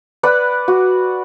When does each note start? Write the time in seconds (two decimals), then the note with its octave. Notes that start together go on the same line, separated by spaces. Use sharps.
0.23 B4 D5 F#5 B5
0.68 F#4